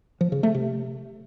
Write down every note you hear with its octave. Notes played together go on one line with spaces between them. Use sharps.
F3
C#3
A3
C3